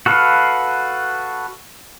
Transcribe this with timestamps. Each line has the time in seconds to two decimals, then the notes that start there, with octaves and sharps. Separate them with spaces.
0.06 F#4 A4 B4 F5